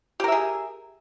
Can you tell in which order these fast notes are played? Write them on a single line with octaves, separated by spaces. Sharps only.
G4 A#4 E5 G#4